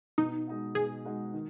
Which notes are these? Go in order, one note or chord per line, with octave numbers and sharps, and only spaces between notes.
B2 D#4
G#3 D#4 F#4
B2 G#4
G#3 D#4 F#4
D#3